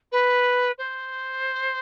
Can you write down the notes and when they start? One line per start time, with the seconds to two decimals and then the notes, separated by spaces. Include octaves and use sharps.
0.12 B4
0.78 C5